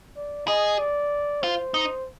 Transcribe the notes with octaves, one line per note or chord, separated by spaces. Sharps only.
D5
G#4 D#5
D5
F4 C5
D#4